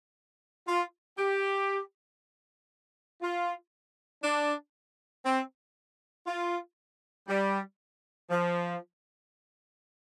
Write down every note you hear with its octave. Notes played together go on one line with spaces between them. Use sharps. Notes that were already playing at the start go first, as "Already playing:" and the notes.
F4
G4
F4
D4
C4
F4
G3
F3